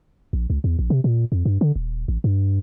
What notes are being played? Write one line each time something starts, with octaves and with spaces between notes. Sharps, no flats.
A#1
C#2
E2
A#1
C3
A#2
F2
G2
D3
D#1
A1
G2